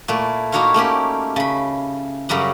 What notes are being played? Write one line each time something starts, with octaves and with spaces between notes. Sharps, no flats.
A#2 A3 E4
A#3 D#4 E4 F#4 C#5 F5
A3 A#3 C#4 G4
C#3 B5
F#2 C#3 F#3 G3 F#5